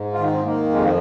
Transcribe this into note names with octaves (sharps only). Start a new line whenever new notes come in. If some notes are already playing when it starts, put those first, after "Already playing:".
Already playing: G#2
F4
D#3 D#4
C4
D#3 A#3
F2 G#3
F3